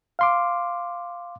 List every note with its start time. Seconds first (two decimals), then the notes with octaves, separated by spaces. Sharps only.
0.19 F5 C6 D6